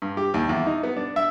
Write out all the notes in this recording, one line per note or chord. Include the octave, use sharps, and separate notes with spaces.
G2
G4
D#2
E2
D#4
B3
D4
E5